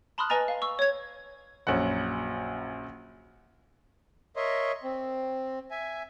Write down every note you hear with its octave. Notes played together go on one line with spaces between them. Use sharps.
A5 B5 C6 D#6 F6 F#6
B4 D#5 G#5 A#5 A6
F5
C#6 E6
C#5 G#6
A#1 F#2 F#3 F#5
A#4 C#5 D#5 E5 C6
C4
E5 G#5